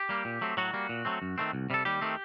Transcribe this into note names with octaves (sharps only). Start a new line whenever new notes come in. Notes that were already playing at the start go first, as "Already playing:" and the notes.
Already playing: G4
G3 A#3
A#2
F#3 A3 C4
A2 F#3 F#4
G3 A#3
A#2
F#3 A3 C4
F#2
D#3 A3 C4
C2
C3 G3 A4
D#2 G3 G4
D#3 A3 C4